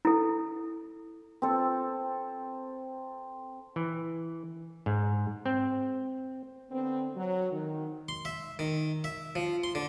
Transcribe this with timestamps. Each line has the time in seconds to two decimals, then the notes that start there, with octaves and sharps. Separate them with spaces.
0.05 E4 A4
1.42 C4 A4
3.76 E3
4.86 G#2
5.46 C4
6.70 D3 B3 C4
7.15 F#3
7.51 D#3
8.09 C6
8.25 E5
8.59 D#3
9.04 E5
9.35 F3
9.64 C6
9.75 D3